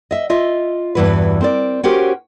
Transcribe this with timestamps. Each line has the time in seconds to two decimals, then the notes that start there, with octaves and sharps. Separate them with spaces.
0.11 D#5 E5
0.30 F4 D#5 E5
0.95 E2 G2 A#2 E3 F#4 B4
1.41 C4 A#4 D5
1.83 C#4 F#4 G4 A#4 C5